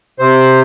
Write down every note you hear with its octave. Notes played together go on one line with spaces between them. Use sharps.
C3 C5